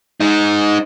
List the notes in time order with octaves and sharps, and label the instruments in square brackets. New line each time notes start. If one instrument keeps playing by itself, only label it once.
[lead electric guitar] G#3 D#4